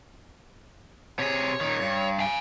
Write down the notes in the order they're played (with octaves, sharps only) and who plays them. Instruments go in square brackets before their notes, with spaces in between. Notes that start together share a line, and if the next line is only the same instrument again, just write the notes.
[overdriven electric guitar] C3 G#4 [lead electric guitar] C#5
[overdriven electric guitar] A#2 D#3
G2
[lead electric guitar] F5 G#5